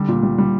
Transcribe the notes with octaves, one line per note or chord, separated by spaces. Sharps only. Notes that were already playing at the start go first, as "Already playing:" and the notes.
Already playing: D3 G3
A#2
G3
G3